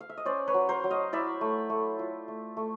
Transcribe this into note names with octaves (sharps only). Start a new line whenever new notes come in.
F5
E5
D#5
C#4 C5 D5
B4 C#5
F#3
A#4 C5
F#3
D#5 F5
E4 D5 E5
A3
A3
F4
A3
A3